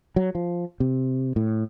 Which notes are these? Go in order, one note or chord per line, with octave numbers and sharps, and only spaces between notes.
F#3
F3
C3
A2